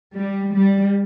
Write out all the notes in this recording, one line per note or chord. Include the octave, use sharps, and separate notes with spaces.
G3
G3